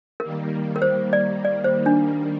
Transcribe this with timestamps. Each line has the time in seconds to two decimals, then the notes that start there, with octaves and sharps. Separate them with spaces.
0.20 D#3 G3 A#3 A#4
0.76 A#4
0.82 C5
1.13 D5
1.45 D5
1.64 C5
1.86 D4